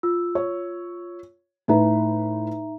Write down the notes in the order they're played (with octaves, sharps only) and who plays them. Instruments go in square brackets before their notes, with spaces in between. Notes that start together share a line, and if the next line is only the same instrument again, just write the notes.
[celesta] F4 E6
[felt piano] C#5
[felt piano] A2 B4 [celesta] D#4 E5 A#5